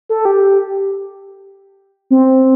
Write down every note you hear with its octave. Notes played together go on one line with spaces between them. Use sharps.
A4
G4
C4